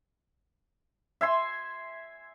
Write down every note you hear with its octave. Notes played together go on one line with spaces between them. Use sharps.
E5 G#5 C6